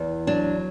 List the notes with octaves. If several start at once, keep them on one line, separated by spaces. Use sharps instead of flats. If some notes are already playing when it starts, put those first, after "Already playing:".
Already playing: E2
F#3 D4